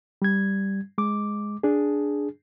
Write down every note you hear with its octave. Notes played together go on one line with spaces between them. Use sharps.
G3 G#6
G#3 D6
D4 G#4